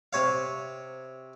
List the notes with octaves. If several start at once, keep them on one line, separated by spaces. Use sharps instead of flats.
C3 C#5 F5